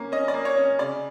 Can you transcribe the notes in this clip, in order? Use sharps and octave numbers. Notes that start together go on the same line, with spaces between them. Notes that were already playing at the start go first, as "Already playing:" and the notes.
Already playing: A#3 C#4
C#4 D#5
D5
A#3
C#5
C#4
C#3 D5